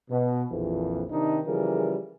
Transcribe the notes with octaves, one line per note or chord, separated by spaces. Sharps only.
B2
A#1 F2 E3
C3 D#3 D4 D#4
C#3 E3 F3 G3 G#4 A#4